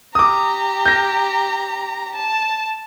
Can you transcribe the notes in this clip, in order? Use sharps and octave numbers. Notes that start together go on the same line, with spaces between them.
G4 A#5 D6 D#6
G6 A#6
A5